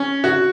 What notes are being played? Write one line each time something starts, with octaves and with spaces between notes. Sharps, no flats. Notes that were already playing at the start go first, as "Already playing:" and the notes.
Already playing: C#4
F#4